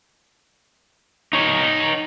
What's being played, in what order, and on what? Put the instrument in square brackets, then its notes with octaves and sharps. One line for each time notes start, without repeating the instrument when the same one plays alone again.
[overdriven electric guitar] D#4 C#5